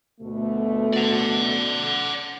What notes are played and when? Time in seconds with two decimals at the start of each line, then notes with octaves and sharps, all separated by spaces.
0.21 D2 B2 A3
0.93 D5 F#5